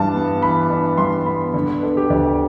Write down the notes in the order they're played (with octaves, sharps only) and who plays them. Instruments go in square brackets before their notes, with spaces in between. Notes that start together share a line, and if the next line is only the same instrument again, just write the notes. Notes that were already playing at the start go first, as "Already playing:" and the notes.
Already playing: [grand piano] G2 E3 D4 A5
B3
E3 B5
D4
G2 C6
B3 B5
D3
B4
D4 A4
G4
D2 D5